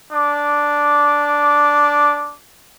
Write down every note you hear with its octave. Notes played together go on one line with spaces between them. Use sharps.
D4 D6